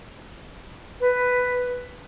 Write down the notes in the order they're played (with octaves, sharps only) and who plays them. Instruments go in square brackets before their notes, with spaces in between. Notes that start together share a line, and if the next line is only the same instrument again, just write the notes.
[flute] B4